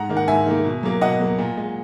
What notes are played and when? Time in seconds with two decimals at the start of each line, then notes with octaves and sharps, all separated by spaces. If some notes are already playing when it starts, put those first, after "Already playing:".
Already playing: G#2 F#5 A#5
0.09 D#3 A#3
0.17 F#5
0.28 G#2 E5 G#5
0.46 D#3 A#3
0.65 B2
0.83 F#3 A#3
1.01 B2 D#5 F#5
1.20 F#3 A#3
1.38 A#2
1.57 G#3